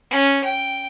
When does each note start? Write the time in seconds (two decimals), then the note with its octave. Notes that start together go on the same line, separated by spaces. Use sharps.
0.11 C#4
0.44 G5